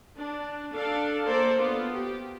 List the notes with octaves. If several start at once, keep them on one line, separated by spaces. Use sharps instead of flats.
D4
D4 A4 F5
A#3 A4 A#4 C5 D5
B3 F4
G4